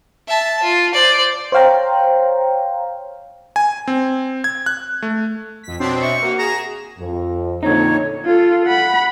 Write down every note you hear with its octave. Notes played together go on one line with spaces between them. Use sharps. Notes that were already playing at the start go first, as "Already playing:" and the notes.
E5 A5
F4
C5 D5
C5 C#5 F5 G5 A#5
G#5
C4
G#6
F#6
A3
F2 B6
B2 C4 D4 C#5 C6
E5 C#6
A#3 F#4
G#4 A#5 E7
F2
F2 A#2 D3 D#4 C#5
F4 A4
F#5 B5